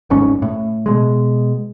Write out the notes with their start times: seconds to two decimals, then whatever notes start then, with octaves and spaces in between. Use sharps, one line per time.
0.10 D1 G1 G#2 C#4
0.42 A2
0.86 B2 G#3